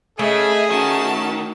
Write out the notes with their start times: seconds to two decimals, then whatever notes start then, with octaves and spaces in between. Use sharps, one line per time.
0.19 C#3 A3 G#4 D#5 E5
0.70 D#3 C#4 F#4 A5